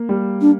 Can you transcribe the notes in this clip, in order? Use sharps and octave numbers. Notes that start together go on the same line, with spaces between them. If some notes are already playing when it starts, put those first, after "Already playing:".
Already playing: A#3
G3
D4